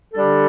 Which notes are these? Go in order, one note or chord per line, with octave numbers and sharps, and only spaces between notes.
D3 G3 D4 A4